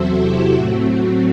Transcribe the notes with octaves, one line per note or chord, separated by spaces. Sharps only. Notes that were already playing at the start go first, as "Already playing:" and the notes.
Already playing: E2 C3 F#3 F#4 A4 C5 E5
E4 G4
A2 F#3 A3 C4 F#4